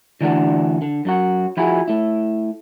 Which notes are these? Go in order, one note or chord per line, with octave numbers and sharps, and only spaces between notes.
D3 E3 A3 D4 F#4 A4
D3
F#2 F#3 F#4
F3 E4 F#4 G#4
A3 E4